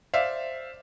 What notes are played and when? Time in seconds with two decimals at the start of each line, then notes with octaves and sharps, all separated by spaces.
0.14 C5 D5 E5 F5